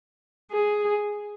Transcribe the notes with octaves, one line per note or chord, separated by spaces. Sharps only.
G#4